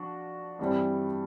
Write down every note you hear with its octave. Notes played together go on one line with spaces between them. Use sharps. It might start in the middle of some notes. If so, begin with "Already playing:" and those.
Already playing: F3 D4 F#4
G2 E3 G3 C4